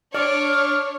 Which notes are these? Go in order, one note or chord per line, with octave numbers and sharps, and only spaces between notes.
D4 C#5 D5 C#6 D6 F6